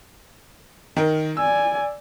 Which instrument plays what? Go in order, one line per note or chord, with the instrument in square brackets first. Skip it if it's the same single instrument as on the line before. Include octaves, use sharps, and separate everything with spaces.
[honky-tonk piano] D#3 A#4
[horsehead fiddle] D5 G#5 [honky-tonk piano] E6